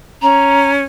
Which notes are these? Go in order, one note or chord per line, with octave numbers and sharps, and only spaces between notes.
C#4 A#5